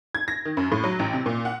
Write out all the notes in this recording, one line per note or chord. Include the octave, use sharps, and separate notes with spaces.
G#6
A#6
D#3
F#2
A2
F#3
A1
C3
A#2
F#5